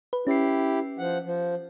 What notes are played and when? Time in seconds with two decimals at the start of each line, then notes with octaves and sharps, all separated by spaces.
0.13 B4
0.27 C#4 E4 G4 C7
0.98 F3 F#5
1.25 F3